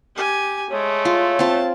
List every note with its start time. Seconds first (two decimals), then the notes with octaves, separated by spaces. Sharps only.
0.15 G4 G#5
0.70 G#3 A3 C#5
1.05 F4
1.39 C4 F4 A5